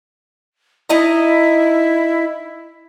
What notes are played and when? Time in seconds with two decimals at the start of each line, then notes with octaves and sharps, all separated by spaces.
0.90 D#4 E4 D#5 A#5